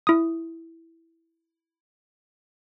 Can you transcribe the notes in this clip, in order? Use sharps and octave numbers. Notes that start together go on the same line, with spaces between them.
E4 D#6